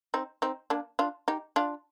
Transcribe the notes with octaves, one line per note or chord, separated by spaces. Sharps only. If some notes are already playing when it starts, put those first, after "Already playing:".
C4 D#4
C4 D#4
A#3 D4
D4 F4
D#4 G4
D4 F4